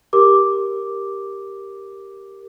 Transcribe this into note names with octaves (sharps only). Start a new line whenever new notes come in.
G4 A#4 D6